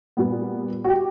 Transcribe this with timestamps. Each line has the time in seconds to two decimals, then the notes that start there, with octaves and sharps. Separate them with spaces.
0.17 A#2 G3 B3
0.84 F#4
0.89 G4